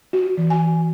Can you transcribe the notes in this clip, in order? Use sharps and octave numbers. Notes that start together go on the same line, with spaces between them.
F#4
E3
G#5